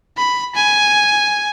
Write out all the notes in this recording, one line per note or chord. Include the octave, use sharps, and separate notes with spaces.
B5
G#5